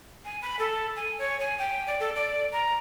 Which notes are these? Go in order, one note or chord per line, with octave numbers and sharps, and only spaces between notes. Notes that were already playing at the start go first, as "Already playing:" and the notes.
G#5
B5
A4
G#5
C#5
G#5
G5
D5
A4
D5
A#5